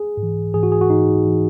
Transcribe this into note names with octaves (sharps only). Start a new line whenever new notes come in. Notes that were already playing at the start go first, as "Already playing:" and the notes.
Already playing: G#4
G#2
E3
G#2 E3 G#4
F#4
G#4
F#4
G#2 E3 D#4
E3